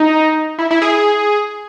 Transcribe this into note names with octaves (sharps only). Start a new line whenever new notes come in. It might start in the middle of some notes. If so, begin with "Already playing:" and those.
Already playing: D#4
E4
E4
G#4